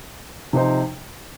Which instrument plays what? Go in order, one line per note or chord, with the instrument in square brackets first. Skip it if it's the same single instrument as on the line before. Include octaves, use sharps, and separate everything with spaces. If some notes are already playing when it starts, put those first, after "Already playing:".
[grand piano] C3 F3 D#4 C5